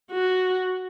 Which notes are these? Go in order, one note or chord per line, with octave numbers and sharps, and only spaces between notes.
F#4